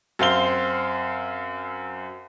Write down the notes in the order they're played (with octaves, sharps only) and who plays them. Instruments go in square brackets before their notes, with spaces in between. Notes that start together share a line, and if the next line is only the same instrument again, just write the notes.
[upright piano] F#2 C4 F5 G7